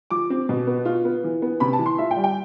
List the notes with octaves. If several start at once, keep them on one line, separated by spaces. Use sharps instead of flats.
F3 D6
C4
B2
B3
F4
B3
E3
B3
C3 B5
A5
E3
C6
F4 E5
G5
G3
G5